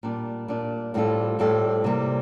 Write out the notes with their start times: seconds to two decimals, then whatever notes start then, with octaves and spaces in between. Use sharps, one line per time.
0.03 A#2 G3 D4
0.48 A#2 G3 D4
0.94 A2 G3 C4 F4 A4
1.39 A2 G3 C4 F4 A4
1.84 C3 G3 A#3